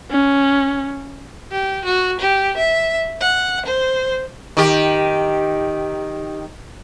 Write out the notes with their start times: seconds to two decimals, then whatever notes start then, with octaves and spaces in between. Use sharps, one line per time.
0.11 C#4
1.52 G4
1.85 F#4
2.20 G4
2.57 E5
3.21 F#5
3.66 C5
4.57 D#3 G4